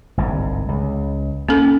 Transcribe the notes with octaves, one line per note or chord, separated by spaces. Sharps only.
G1 C2 G#2
C#2
A#3 C#4 A4